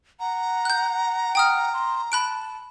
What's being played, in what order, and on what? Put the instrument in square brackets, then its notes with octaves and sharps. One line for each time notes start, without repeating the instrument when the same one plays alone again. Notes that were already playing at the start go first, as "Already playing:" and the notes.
[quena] F#5 [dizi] A#5
[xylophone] F#6 G6
G5 D#6 F6
[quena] C6
[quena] A5 [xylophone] B5 F#6 D7